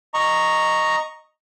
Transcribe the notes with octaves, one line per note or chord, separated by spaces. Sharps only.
D#5 A#5 C#6